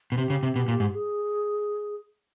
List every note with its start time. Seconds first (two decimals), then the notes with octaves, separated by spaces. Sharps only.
0.12 B2
0.18 C3 G4
0.30 C#3
0.43 C3
0.56 B2
0.68 A#2
0.80 G#2
0.94 G#4